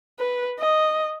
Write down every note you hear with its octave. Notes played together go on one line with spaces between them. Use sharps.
B4
D#5